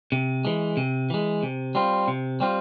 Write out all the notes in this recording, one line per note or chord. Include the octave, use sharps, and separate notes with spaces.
C3
E3 G#3
C3
E3 G#3
C3
G3 C4 F4
C3
G3 C4 F4